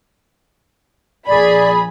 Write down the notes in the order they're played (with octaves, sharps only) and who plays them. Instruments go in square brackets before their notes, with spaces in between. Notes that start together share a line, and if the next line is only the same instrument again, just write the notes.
[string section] A#1 G#4 B5 [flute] D5